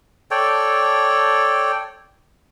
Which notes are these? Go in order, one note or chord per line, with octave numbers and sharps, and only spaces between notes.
A4 C#5 D5 G5